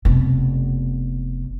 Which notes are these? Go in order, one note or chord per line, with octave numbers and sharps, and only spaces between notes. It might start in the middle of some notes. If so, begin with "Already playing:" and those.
F1 B2